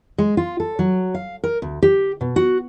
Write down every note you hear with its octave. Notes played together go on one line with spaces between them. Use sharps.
G#3
F4
A4
F#3
F5
A#4
D2
G4
B2
F#4